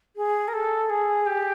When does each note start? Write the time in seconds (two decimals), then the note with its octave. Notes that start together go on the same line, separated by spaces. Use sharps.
0.16 G#4
0.48 A#4
0.53 A4
0.89 G#4
1.26 G4